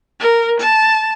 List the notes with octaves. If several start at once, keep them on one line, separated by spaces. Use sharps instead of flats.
A#4
A5